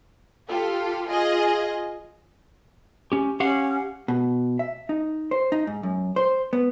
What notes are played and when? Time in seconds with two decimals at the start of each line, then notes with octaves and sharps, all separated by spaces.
0.48 F4 G4 A4
1.07 F4 G#4 D#5
3.12 C#4 G4
3.40 C#4 G4 F5 F#5
4.08 B2
4.59 E5
4.89 D#4
5.31 C5
5.52 D#4
5.67 G#2
5.83 F#2
6.16 C5
6.53 B3